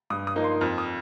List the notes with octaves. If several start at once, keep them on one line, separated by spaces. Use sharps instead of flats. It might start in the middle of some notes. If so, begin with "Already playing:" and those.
G2 D#6
D#6
F3 A#3 D#4
C6
F2 F6
D#6